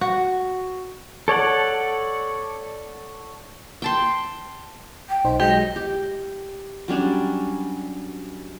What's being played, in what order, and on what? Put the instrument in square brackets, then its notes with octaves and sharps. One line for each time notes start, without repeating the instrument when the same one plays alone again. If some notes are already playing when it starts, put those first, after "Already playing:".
[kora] F#4
[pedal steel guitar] A4 C#5 D5 F#5
[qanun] G5 A5 C6
[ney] G5
[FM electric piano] B1 D#4 C5
[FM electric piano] F#3 G#3 [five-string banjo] G4 [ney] D#5
[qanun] G4
F#3 G3 C#4 D4